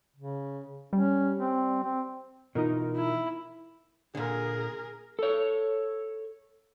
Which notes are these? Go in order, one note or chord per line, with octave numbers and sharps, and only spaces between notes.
C#3
G3 C#4
C4
C4
B2 E3 D#4 F4 A#4
E4
A#2 D3 G#4 A#4
A4 C#5